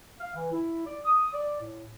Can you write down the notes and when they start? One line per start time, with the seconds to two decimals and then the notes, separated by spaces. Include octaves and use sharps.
0.20 F5
0.35 E3
0.52 E4
0.86 D5
1.05 D#6
1.33 D5
1.61 A2